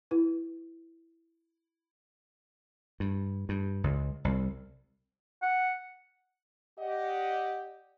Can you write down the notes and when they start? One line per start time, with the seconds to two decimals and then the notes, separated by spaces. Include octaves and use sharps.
0.11 E4 B4
3.00 G2
3.49 G2
3.84 C#2
4.25 C2
5.42 F#5
6.79 G4 D5 D#5 F#5